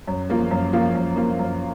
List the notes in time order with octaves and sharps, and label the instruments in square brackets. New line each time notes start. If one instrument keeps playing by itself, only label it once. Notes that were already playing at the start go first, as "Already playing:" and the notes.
[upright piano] F#2
F3 A#3 F4
F#2
F3 A#3 F4
F#2
F3 A#3 F4
F#2